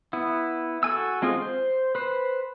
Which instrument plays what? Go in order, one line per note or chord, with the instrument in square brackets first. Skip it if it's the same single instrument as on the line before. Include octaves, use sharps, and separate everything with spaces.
[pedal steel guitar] B3 E4
F#4 A4 G#5 E6
G#3 C4 F4 G#4
C5
B4 C5